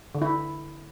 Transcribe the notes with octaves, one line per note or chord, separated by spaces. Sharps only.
D3
E4